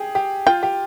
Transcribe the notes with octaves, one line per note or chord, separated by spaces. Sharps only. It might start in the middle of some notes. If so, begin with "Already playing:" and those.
Already playing: G4 G#4
G4
F4 G5
G4